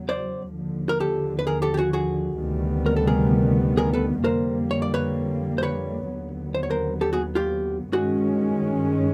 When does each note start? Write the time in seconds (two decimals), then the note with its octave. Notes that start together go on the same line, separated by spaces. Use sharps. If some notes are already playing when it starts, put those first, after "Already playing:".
Already playing: E2 C#3 F#3
0.09 C5 D5
0.55 D#2 D3 F3
0.89 A#4
1.00 G4 A4
1.39 B4
1.47 G#4 A#4
1.62 G4 A4
1.74 G4
1.77 F#4 G#4
1.93 F#4 G#4
2.40 D2 C3 D#3 G3 B3
2.86 A#4
2.96 A4
3.07 G#4 A#4
3.77 G#4 A#4
3.94 A4 B4
4.24 F2 D3 G3 A#3 A#4 C5
4.71 C#5
4.82 D5
4.94 B4 C#5
5.58 C5
5.63 B4 C#5
6.09 D#2 D3 F#3 B3
6.55 C5
6.63 C#5
6.71 A#4 C5
7.01 G4 A4
7.13 F#4 G#4
7.35 F4 G4
7.93 G2 D#3 G#3 C#4 F#4 G#4